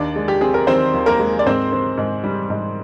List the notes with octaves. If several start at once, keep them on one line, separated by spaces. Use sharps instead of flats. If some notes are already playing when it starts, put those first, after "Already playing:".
Already playing: D#2 D4 D5
G#3
G4
C4 G#4
A#4
D#3 C4 C5
D#2
A#3 A#4
G#3
D5
G#2 C4 C5
C4
G#2
G3
G#2